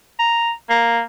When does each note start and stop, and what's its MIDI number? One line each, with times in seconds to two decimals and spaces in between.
0.19 0.51 82
0.69 1.01 58